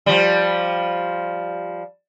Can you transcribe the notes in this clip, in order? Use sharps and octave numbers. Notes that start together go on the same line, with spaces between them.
F3 G3